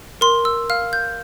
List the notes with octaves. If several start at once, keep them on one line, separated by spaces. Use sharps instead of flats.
A#4 C6
E6
F5 F6
G6